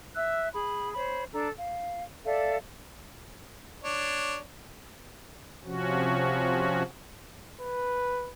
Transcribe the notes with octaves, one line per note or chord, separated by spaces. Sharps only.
E5 E6 F#6
G#4 B5
C5 C#5 B5
D4 A4 A#5
F5
A4 D5 E5 F5
D4 C#5
C3 F3 C#4 F#4
B4